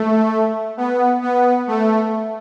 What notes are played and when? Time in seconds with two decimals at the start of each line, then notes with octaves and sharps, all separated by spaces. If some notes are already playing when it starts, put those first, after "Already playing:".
Already playing: A3
0.77 B3
1.22 B3
1.67 A3